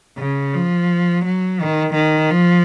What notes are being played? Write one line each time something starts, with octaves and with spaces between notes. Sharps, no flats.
C#3
F3
F#3
D#3
D#3
F3